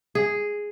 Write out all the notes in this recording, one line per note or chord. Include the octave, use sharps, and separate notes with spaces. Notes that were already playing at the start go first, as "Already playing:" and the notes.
G#4